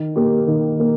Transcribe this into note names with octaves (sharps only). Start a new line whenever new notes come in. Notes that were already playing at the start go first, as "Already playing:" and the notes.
Already playing: D#3
A#3 G4
D#3
A#3